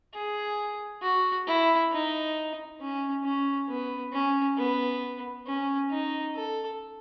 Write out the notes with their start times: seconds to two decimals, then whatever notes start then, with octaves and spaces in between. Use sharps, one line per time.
0.14 G#4
1.02 F#4
1.47 E4
1.92 D#4
2.80 C#4
3.24 C#4
3.69 B3
4.13 C#4
4.57 B3
5.46 C#4
5.91 D#4
6.35 A4